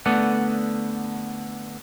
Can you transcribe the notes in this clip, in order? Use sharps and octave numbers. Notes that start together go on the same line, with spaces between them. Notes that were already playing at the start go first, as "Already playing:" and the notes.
D3 A3 B3 A4 D5 F#5